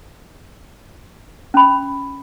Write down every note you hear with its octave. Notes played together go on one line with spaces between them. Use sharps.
C#4 B5